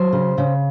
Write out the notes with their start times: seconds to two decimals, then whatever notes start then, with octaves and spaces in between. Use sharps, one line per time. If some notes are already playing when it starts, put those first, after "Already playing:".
Already playing: F#3 C5
0.13 C#3
0.38 C#3